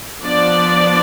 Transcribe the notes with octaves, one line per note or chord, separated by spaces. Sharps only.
F3 B3 D4 D5